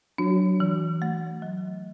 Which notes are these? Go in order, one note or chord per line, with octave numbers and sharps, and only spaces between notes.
F#3 D4
E3
A3
F#3